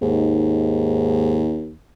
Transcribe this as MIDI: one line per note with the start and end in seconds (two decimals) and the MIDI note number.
0.02 1.74 39
0.02 1.42 44